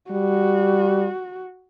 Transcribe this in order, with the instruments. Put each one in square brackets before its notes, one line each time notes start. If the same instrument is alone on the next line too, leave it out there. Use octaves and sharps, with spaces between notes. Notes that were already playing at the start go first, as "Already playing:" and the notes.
[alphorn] G3 [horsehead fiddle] F#4